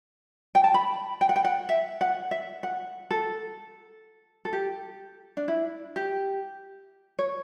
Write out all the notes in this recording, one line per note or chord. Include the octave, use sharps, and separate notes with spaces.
G5
A5
B5
G5
F#5
G5
F#5
E5
F#5
E5
F#5
A4
A4
G4
D4
E4
G4
C#5